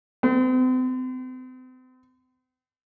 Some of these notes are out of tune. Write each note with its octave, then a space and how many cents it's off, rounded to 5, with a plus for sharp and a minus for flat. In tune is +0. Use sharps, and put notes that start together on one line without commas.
C4 -40